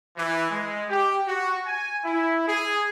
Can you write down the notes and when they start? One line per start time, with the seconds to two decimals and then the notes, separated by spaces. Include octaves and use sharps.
0.17 E3
0.51 G#3
0.89 G4
1.27 F#4
1.67 G#5
2.04 E4
2.47 G#4